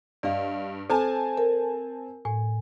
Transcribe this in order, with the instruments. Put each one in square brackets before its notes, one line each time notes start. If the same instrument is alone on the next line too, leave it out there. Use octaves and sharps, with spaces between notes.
[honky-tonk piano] G2 [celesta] D5 D#5 F5
[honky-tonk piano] C4 G#5 A5 [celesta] A4 C5
[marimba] A#4
[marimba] A2 [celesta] G#5